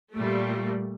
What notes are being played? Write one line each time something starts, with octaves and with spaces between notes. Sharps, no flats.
A#2 G3 A3